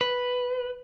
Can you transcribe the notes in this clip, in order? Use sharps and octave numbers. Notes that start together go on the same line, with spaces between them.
B4